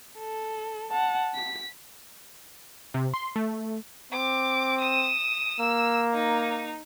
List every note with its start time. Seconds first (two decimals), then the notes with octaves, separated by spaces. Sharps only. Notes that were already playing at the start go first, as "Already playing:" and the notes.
0.19 A4
0.91 F#5 A5
1.35 B6
2.94 C3
3.14 C6
3.36 A3
4.13 C4 D6
4.81 D#6 E7
5.60 A#3 E6
6.14 D#4